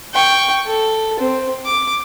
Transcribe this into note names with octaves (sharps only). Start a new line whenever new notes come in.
G5 C#6
A4
C4
D6